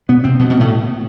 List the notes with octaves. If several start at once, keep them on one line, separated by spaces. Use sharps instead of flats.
B2 B3
C3 C4
B2 B3
B2 B3
A2 A3